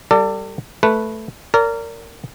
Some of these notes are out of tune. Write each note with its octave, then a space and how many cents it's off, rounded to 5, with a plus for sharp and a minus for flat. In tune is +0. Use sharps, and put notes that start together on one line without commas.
G3 +0 A4 +40 D5 +0
A3 +0 B4 +0
A#4 -20 D5 -35